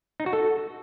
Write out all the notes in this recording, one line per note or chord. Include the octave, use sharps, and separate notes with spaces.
D#4
F#4
A4